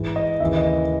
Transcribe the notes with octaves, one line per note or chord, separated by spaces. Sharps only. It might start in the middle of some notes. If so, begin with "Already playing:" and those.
Already playing: G#2 E3
D#5
D#2 C#3 E3 E5
D#5